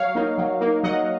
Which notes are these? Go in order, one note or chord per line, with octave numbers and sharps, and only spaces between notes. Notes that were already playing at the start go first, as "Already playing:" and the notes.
Already playing: F#3 C#5 F5
A#3 D#4
F#3
A#3 D#4
F#3 D#5 F#5